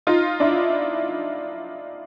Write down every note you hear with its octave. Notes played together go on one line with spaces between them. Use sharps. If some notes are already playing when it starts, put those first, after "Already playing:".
D#4 F4
D4 E4